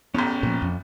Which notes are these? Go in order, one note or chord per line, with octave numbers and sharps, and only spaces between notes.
A1 E2 C#4 G5
A#2 F3
F2